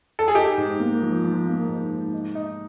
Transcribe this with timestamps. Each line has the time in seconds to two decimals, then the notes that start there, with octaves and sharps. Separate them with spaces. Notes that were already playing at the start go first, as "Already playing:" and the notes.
0.19 A4
0.28 G#4
0.35 D#4 G4
0.58 G#2
0.80 A#3
1.02 F3
1.24 F3
1.46 A#3
1.69 G#2
1.91 G#2
2.14 D#4
2.35 D#4